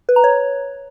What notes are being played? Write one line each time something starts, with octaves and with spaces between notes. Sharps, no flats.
B4
A#5
C#5